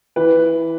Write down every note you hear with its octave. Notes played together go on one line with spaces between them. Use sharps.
E3 B4